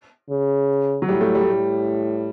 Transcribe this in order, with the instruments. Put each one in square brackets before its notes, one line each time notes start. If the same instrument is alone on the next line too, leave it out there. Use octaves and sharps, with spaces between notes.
[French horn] C#3
[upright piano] F#3
[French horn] A2 [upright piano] G3
[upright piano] A3
G3
[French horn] A2